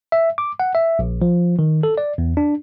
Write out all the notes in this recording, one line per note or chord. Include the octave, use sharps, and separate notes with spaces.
E5
D6
F#5
E5
A#1
F3
D#3
A4
D5
E2
D4